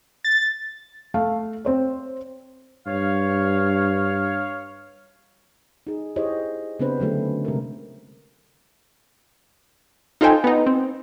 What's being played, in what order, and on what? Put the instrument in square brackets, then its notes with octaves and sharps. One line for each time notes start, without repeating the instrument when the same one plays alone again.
[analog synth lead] A6
[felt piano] A3 F5
C4 C5 C#5
[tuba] G2 [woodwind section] C#5 F5
[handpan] D#4 G#4
E4 G4 G#4 C5 C#5 D#5
C#3 B3 C4 D4 B4 C5
D3 F#3 A3 C#4
C3 G#3 A#4
[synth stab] D#4 F4 A4 C5 G5 G#5
B3 D#4
C4